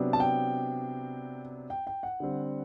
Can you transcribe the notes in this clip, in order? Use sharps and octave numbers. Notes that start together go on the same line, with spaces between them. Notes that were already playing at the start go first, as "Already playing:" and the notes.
Already playing: C3 F#3 B3 D4
A5
G5
G5
G5
F#5
D3 G3 C4